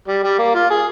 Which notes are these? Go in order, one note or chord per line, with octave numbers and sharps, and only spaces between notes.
G3
G3
A#3
F4
G#4